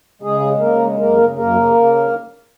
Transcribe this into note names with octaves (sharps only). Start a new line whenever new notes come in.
C#3 G#3 G#4
G#3
C#3 A#3 A#4
G#3
F#2 A#3 A#4
C#3
F#2 A#3 A#4
C#3
C#3